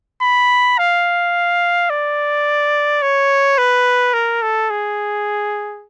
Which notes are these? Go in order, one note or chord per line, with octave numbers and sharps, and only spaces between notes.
B5
F5
D5
C#5
B4
A#4
A4
G#4